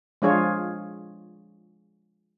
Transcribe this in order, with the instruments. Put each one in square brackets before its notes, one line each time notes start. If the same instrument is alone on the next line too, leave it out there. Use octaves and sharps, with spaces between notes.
[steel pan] F3 G#3 D4 F4 G#4 C#5